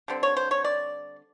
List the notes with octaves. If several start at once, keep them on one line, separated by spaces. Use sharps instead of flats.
D3 G3 C4
C#5
C5
C#5
D5